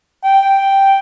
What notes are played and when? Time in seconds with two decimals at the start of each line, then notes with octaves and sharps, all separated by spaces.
0.24 G5